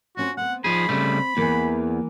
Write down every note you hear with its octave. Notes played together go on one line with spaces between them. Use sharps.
C4 C#4 F4 F#4
B3 C4 F#5
F3 D#4 G#4 B5
C#3 G3 A3 C4
E2 E3 A#3